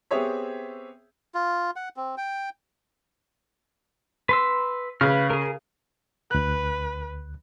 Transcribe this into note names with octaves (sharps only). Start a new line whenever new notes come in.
B3 C4 G4 G#4 C#5 E5
F4
F#5
C4
G5
B4 C6 E6
C#3 B4 F6
G#4 A#4
D2 B4 F#6